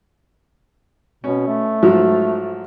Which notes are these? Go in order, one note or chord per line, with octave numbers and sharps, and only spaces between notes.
B2 C#4
A3
G#2 F3 F#3